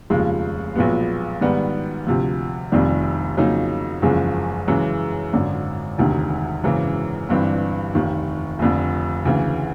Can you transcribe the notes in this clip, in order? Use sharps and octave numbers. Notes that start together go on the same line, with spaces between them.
F1 D#2 C#3 F3 G#3
B1 A#2 F3 G#3 B3
G#2 D#3 G3 B3
D2 C3 F3
F1 F2 C3 D#3 G3
F2 C#3 F#3 A#3 D#4
F#1 E2 C#3 F3 G#3
F#2 C#3 E3 G#3
G#1 F#2 D3
E1 D2 C3 D#3
G#1 F#2 C#3 E3
G1 G2 E3 G3 C4
F1 D#2 D#3
F1 F2 D3
D2 C#3 E3